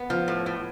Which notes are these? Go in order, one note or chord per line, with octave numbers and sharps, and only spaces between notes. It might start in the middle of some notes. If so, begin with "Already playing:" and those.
Already playing: B3
F3
A2
A2